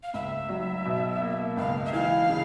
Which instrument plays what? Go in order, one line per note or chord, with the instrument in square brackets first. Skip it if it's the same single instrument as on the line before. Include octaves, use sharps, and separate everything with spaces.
[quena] F5
[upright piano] C#2 [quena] E5
[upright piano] F#3
B2
A#3
[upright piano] C#2 [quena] F5
[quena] E5
[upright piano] E3 [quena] F5
[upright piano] C#3